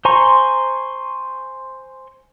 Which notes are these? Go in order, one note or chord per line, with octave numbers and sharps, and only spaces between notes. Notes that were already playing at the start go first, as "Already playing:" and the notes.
C5 G#5 A#5 C6 C#6